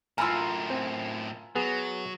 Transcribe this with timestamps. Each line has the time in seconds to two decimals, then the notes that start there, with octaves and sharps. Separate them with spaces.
0.18 F#2 A2 F4 A#4 G#5 B5 E6
0.70 C4
1.56 F#3 B3 G#4